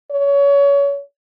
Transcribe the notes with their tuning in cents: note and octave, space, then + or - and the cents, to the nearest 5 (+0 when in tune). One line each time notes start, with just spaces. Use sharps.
C#5 +25